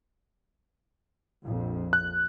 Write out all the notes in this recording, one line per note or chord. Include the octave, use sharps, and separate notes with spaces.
A#1 F2
F#6